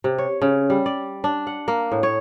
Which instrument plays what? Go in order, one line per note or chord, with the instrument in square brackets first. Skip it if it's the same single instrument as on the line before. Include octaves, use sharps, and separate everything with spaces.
[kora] C3
C#5
C#3
G3
D5
D4
F#5
A#3
A2
C#5